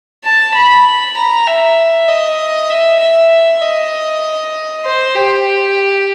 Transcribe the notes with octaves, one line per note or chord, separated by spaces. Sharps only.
A5
B5
A#5
E5
D#5
E5
E5
D#5
C5
G4